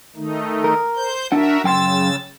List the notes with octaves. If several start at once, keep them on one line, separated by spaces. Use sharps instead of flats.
D#3 A3 D#4
A#4
C5 G6
D4 F#4 A#4 E5 F#5
F#2 C#3 G5 C6 E6 A6